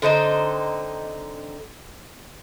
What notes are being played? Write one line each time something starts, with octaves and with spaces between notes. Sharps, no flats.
D3 C4 D#4 C5